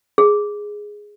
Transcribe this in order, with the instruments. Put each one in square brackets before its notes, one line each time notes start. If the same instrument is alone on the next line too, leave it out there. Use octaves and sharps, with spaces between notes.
[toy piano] G#4